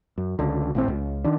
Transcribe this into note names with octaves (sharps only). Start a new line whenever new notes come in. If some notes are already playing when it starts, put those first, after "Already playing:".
F#2
C#2 D3
G#1 A2 C4
C#2
D#3 D4